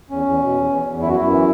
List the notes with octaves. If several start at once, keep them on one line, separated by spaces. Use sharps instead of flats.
E2 C#4
E2
B2
E2
E2
E2
F#2 E4
F#4
F#2 E4
E3